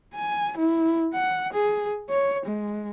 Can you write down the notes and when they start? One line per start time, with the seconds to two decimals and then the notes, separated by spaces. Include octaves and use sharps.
0.14 G#5
0.57 E4
1.14 F#5
1.53 G#4
2.09 C#5
2.46 G#3